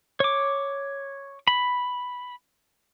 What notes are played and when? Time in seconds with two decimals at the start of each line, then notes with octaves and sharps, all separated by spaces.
0.20 C#5 D6
1.48 B5